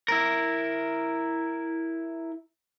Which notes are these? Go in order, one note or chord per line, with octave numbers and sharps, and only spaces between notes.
E4 A#4